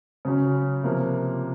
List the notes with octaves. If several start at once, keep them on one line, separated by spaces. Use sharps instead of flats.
C#3 F#3 C#4
C3 F3 A#3